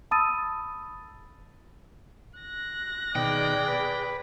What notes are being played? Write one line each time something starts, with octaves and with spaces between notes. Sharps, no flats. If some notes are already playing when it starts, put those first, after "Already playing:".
A5 B5 D#6 E6 A6 D#7
F#6 A#6
B2 D#3 G#4 D5 G5
B4